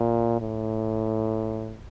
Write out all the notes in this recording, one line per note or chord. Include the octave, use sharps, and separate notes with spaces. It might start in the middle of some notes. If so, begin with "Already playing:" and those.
Already playing: A#2
A2